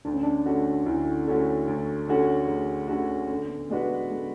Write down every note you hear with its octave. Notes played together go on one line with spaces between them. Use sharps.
D2 D4
C#4
D4
D3 A3 C#4 F#4
D2 E4
D3 A3 C#4 F#4
D2
D3 A3 C#4 F#4
D2 G#4
D3 A3 C#4 F#4
D3 C#4
B3
G#3 B3 D4 F#4 B4
B3
D3 G#3